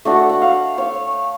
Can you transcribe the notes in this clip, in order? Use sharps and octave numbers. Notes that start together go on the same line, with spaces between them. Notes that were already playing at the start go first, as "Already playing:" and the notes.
A3 D4 F#4
F#5
F5
C#5 F5